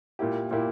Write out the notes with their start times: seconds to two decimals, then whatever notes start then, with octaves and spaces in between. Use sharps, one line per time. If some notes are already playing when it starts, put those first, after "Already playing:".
0.19 A#2 A#3 E4 G4
0.51 A#2 A#3 E4 G4